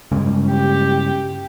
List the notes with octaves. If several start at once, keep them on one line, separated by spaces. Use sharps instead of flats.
G2 C#3 G#3
G4